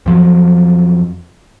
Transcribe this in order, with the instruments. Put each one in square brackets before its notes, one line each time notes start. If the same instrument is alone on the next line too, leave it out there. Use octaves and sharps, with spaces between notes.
[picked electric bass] F2 F3 F#3